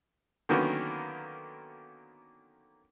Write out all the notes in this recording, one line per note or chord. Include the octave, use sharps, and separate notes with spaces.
D3 D#3 F#3 A#3 B3 C#4